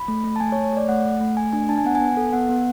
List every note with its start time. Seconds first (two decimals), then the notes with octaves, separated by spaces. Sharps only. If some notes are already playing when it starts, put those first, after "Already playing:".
Already playing: B5
0.08 A3
0.24 A3
0.36 A5
0.40 A3 G#5
0.52 C#5
0.56 A3
0.64 C#5
0.72 A3 D5
0.89 A3 F#5
1.05 A3
1.21 A3
1.37 A3 G#5
1.53 D4 G#5
1.69 D4 A5
1.78 G#5
1.85 B3 F#5
1.95 G#5
2.01 B3
2.17 A4
2.33 B3 F#5
2.49 B3